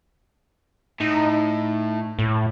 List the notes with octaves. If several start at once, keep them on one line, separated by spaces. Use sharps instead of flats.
A2 D#4
A2